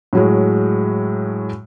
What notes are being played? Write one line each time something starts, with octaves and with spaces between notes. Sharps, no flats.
A2 F#3 G#3